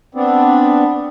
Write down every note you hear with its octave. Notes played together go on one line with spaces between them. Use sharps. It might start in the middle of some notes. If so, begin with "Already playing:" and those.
B3 C4 D4